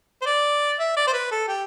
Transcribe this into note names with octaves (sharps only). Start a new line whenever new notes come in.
C5
D5
E5
D5
C5
B4
A4
G4